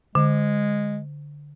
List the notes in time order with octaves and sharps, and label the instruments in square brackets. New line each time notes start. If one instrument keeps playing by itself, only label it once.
[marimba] D3 [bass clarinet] G#3